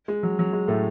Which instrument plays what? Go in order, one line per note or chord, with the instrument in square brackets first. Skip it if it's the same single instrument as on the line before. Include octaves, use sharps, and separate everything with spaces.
[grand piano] G#3
F#3
F#3
G#3
A2 A3